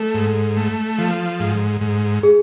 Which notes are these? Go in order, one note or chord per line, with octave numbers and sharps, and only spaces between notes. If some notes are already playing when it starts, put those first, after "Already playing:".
Already playing: A3 A4
G#2
A3
F3
G#2
G#2
G#4